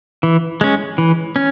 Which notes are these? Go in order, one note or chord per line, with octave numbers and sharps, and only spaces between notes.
E3
G#3 C#4
E3
C#4